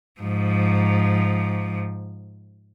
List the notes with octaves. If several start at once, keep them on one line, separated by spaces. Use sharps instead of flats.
G#2 F3